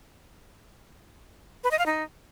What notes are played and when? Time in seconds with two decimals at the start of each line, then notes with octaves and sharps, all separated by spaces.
1.64 B4
1.71 D#5
1.79 F5
1.86 D#4